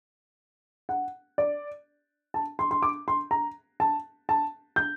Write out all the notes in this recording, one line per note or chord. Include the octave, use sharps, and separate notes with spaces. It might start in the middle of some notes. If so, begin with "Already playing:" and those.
F#5
D5
A5
C6
C6
D6
C6
A#5
A5
A5
G6